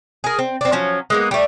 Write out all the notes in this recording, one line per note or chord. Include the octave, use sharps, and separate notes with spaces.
G#4 A#4
C4
C4 D4
F3 F#3 C#4
G#3 A#3 B3
G3 A3